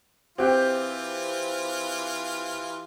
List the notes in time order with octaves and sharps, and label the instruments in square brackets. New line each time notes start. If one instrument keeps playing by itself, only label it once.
[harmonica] E3 F4 [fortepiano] C4 [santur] G4 G5